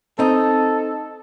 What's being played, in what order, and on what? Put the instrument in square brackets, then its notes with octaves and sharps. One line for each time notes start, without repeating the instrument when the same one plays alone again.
[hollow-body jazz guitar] C4 D#4 [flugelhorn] A4